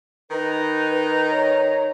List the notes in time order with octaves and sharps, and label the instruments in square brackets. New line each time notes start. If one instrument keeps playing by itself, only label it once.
[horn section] D#3 D#4 A#5 [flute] B4
[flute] C#5